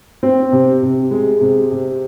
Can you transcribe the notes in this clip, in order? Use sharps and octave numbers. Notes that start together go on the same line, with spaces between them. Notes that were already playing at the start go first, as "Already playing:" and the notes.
C4
C3
C3
G#3
C3
C3